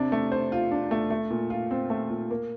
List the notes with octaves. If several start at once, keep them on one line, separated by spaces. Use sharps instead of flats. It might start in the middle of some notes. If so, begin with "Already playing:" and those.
Already playing: C3 D4
A3
C5
F4
D4
A3
A3
A#2
F4
C4
A3
A#2
A#3